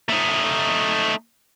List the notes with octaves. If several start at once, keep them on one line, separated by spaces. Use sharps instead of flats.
A3 D#4